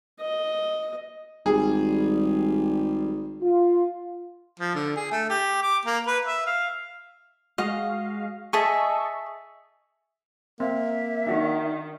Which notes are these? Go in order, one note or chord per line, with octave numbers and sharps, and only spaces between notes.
D#5
G#1 G3 G#4
F4
F3
D3
G#4
A3
G4
D6
A#3
B4
E5
F5
G#3 F#4 D#5 F5
G#4 D#5 E5 A5 C#6
A#3 C4 E5
D#3 D4 F#4